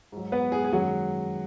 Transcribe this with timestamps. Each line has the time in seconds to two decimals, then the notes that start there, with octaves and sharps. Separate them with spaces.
0.12 G#2 F#3
0.32 B3 B4
0.52 G#3 G#4
0.64 G#4
0.72 F#2 D#3 F#3 G#3 F#4